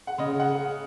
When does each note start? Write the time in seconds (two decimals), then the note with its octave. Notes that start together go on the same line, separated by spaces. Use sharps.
0.07 F#5
0.18 C#3 D#5
0.40 F#5